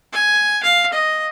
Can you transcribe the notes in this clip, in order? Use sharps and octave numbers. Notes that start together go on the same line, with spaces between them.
G#5
F5
D#5